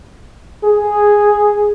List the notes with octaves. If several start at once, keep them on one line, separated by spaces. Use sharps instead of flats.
G#4